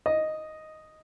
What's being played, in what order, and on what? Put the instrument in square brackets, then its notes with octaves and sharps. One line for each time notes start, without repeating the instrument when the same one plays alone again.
[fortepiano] D#5